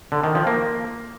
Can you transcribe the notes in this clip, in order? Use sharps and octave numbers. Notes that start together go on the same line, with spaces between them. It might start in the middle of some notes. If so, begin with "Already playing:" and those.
D3
D#3
F3
A#3